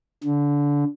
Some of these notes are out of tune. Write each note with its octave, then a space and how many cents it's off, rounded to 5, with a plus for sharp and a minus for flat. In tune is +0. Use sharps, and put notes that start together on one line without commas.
D3 -25